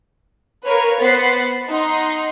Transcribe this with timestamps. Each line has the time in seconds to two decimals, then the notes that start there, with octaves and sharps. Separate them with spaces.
0.65 A#4 B4 C#5 F5
1.00 B3 C5 F#5 A6 B6 C7
1.68 D#4 F#5 C6